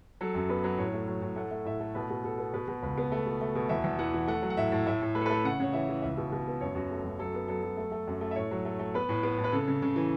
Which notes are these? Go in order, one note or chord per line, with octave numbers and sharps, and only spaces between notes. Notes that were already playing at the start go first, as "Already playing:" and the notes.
F#3 A4
F#2
B3 B4
F#3
A2 C#5
A3
F#3
A2
A3 F#5
A3
A2 E5
A3
B2 B4
B2
B2 A4
B3
B2 B4
B2
C#2 B4
B3
A3
B2
A3
B2
E2 E5
E2
E3 F#5
E3
A3 F#5
F#3
F#5
A2 E5
A2
A2 E5
A2
A3 B4
A4
B4
A3
C#3 F#5
C#3 C#5
E3 E5
E3
C#2 E5
B2
B2
B3
F#2 C#5
F#2 F#4
A3
F#2
F#3 A4
B3
F#3 A4
F#3
A3
A3
F#2
A3
E5
A2 C#5
F#3
A3
A3
B3 B4
A2
B3
A2
B4
C#3 A4
C#3
C#3
E3